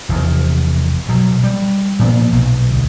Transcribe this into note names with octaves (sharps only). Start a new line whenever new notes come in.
F1 E2
B2 F#3
G3
A#2 F3 B3
B1
D2